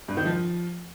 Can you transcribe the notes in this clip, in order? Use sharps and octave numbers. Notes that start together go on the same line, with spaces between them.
G2
D#3
F3